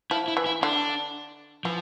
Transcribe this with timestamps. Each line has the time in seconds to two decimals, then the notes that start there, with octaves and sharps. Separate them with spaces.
0.11 F3 E4
0.28 E4
0.37 E3
0.46 E4
0.63 D3 D4
1.65 E3 F3